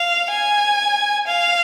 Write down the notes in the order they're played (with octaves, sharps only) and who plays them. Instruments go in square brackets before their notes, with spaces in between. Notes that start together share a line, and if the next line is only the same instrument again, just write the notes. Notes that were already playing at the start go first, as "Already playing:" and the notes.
Already playing: [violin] F5
G#5
F5